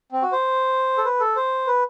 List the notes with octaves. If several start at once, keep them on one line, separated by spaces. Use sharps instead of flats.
C4
F#4
C5
A4
B4
A4
C5
B4